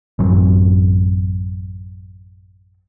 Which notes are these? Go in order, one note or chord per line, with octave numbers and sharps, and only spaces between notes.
A1 F#2 F#3 C4